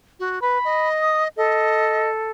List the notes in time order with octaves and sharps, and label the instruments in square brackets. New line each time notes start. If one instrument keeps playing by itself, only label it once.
[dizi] F#4
[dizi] B4 [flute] B5
[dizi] D#5
[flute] D#6
[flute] A4 [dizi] D#5